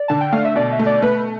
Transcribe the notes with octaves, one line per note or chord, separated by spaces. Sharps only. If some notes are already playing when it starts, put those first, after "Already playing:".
Already playing: D5
D3 A5
G5
A3 F5
E5
B2 D5
E5
A3
D5
A3 B4